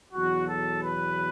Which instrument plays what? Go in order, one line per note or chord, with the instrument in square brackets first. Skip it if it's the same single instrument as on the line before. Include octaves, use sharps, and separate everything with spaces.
[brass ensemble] E2 B2 F#3 F#4
A4
B4